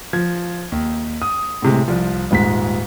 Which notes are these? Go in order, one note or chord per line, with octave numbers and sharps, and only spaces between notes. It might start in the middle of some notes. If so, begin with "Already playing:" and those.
F3 G#6
D#2
D#6
A2 C3 G#3
C2 F3
D#1 G#2 B6